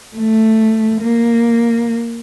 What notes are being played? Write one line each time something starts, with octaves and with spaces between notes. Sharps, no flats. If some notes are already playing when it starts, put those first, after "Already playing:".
A3
A#3